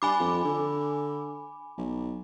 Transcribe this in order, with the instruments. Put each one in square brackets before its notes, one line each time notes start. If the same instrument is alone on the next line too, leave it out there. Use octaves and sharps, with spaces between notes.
[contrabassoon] G2 [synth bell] G#5 B5 D6
[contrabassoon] F2
D3
B1